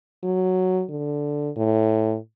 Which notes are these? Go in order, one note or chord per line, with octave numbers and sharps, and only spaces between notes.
F#3
D3
A2